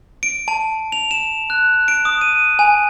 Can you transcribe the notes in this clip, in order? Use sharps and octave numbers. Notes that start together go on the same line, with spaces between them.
D7
A5
F7
E7
F#6
D7
D#6
D#7
G#5